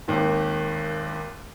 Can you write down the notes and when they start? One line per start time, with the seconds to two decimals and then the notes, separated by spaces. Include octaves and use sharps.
0.08 G#1 D#2 G#2